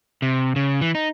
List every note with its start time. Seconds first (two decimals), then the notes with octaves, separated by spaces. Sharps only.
0.22 C3
0.56 C#3
0.81 E3
0.95 D#4